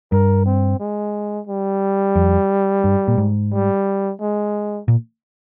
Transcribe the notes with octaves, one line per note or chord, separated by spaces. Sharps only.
G2 A#4
C4
G#3
G3
F2
G2
A#2
G#2
G3
G#3
A#2